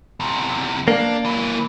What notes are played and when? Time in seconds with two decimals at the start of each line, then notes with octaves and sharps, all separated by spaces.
0.20 E2 C3
0.88 A#3 D4
1.25 E3 F#3